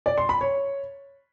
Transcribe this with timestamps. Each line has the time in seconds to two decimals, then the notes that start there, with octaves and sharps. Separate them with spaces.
0.06 D5
0.17 C6
0.29 B5
0.41 C#5